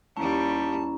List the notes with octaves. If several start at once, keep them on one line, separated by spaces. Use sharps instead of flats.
D#2 G3 C#4 E4 A5 A#5